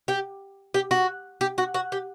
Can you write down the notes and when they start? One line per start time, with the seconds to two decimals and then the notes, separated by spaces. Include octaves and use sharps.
0.08 G4
0.74 G4
0.91 F#4
1.41 G4
1.58 F#4
1.74 F#4
1.92 G4